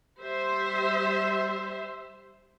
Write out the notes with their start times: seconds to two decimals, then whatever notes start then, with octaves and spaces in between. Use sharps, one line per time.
0.18 G3 C5 E5